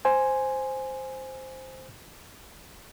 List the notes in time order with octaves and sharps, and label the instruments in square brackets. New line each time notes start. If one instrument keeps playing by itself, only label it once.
[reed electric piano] C5 G#5